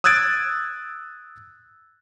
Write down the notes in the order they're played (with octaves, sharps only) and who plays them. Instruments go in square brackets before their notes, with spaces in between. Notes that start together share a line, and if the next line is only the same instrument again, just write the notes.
[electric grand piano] D#6 E6 F#6 G#6 A6 D7